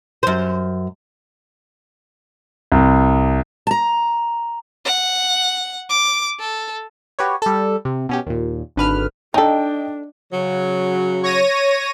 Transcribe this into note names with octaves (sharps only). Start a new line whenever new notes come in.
F#2 C5
C2
A5 A#5
F#5
D6
A4
F#4 G4 B4 C#5
G3 A4
C3
B2 C#4 G4
D#2 A#2
G#1 D3 B4 F6
D4 D#4 A4 D#5 G5
C#3 F#3
C#5 A#6 D#7